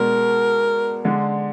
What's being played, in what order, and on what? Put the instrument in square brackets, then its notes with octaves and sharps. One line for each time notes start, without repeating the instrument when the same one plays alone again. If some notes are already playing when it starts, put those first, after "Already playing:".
Already playing: [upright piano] B2 G#3 D4 F#4 [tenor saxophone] A#4
[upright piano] D3 G#3 D4